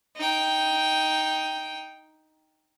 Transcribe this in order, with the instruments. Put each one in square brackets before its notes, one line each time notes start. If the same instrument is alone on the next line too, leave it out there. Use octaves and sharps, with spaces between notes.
[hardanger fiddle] D#4 G5